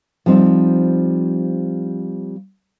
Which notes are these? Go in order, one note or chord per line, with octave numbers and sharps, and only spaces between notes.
F3 G3 C4 D#4